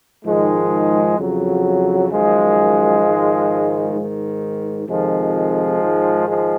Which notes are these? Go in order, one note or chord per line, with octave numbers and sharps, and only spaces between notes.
G#2 D#3 F3 G#3
F2 C#3 F#3
F#2 D#3 F3 G#3
G#2 D#3
G#2 D#3
F2 C3 D#3 F3 G#3
G#2 D#3
F3 G#3